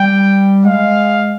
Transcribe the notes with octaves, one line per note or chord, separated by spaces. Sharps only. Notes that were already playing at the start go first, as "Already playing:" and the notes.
Already playing: G3 G5
G#3 F5